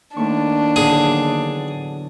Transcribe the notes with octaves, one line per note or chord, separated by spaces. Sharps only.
D#2 A3 D4 C#6
E2 D3 F#3 G#4